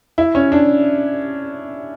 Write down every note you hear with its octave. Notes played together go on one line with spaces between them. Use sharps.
E4
C#4
D4